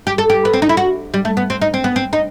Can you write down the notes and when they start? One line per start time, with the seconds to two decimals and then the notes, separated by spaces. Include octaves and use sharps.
0.07 G4
0.18 A4
0.30 G4
0.45 B3
0.53 C4
0.62 D#4
0.69 E4
0.77 F#4
1.14 G3
1.25 A3
1.37 B3
1.50 C4
1.62 D#4
1.74 C4
1.84 B3
1.96 C4
2.13 D#4